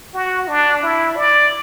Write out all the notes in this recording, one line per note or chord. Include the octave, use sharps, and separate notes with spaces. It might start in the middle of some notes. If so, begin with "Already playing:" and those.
F#4
D4
E4
D5